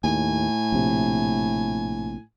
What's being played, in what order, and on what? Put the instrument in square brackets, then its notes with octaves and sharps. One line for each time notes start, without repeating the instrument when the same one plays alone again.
[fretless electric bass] D#2 [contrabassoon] A2 [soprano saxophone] G#5
[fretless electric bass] A#1 C3